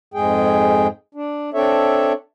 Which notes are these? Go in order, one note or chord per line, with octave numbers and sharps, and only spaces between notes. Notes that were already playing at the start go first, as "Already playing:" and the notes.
F2 G#2 G#3 G#4 G5
D4
C4 D4 A4 C#5 E5